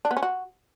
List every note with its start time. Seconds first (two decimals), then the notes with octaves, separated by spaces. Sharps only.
0.05 D4
0.11 B3
0.17 C#4
0.23 F#4